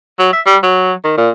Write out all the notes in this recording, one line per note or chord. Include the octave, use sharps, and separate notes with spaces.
F#3
E5
G3
F#3
D#3
A#2